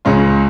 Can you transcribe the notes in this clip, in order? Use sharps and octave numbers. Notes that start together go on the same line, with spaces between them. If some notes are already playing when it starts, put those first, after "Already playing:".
C#2 C#3 G#3 C#4 F4